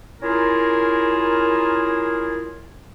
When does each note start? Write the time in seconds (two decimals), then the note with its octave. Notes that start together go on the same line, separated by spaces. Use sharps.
0.21 C#4 E4 F4 G#4 A#4